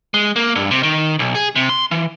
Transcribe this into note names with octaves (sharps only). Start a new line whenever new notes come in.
G#3
A#3
G2
C3
D#3
B1
G#4
C3
C6
E3